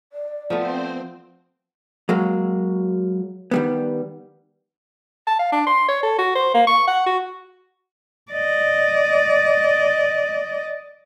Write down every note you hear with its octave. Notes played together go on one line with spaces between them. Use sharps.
D5
F3 A3 B3 C4 C5
F#3 G#3 A#3
D#3 G3 B3
A5
F5
D4
C6
C#5
A4
F#4
C5
A#3
C#6
F#5
F#4
D5 D#5